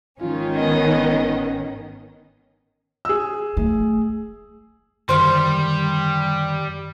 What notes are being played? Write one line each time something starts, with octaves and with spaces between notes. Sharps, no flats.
G#1 D#3 C#4 F4
B3 D#5
G#4 E6
A3
F#2 D3 D#3 G3 C5 F6